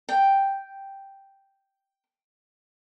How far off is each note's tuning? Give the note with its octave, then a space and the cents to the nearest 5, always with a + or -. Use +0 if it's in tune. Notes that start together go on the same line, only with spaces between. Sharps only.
G5 +0